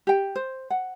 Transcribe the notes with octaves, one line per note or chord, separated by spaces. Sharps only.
G4 G5
C5
F#5